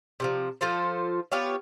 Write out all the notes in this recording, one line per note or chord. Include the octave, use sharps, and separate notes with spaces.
C3 D#3 F3
F3 F4 A4 C5
B3 F4 G4 C#5